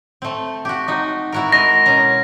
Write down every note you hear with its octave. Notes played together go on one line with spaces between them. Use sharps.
A3 C4
F#4 G4
D#4 F#4
E4 F#4 A#4
G#3 A#4 A#6
B2 C#4 A#5